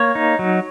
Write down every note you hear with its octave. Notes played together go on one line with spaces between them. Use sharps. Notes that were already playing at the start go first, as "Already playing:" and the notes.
Already playing: A#3 C#5
D#4
F#3